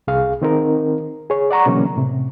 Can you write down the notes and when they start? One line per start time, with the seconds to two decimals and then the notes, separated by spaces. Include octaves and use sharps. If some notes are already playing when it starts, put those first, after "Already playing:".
0.07 C2 G#4 F5
0.42 D#3 C4 D#4 A#4
1.30 G#4 C#5
1.51 D5 F#5 A#5 C#6
1.66 B2 D3 E3 F#3 A#3 C#4
1.96 A2 C3